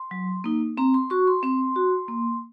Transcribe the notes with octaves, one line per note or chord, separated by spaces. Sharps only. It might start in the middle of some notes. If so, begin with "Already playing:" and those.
Already playing: C6
F#3
A#3 D#4
C4 A#5
C6
F#4 C#6
C6
C4 C6
F#4
A#3